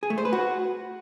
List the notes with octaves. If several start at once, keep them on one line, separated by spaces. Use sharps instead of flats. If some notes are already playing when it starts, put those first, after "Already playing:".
G#4
A3
C5
B4
F#4